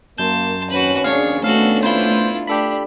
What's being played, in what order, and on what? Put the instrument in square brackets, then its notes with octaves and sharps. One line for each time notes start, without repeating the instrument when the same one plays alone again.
[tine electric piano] F#2 G6 [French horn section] A#3 [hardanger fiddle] A5 C6
[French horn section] D#2 C4 C#4 [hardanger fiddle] F#4 B4
[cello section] D4 G#4 [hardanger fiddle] C#5 [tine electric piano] F5
[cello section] A3 B3 D4 [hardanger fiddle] F#4 A4 [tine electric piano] F5
[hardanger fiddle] E4 F4 [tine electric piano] C5 G6
[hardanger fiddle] D4 [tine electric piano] G4 A4 B5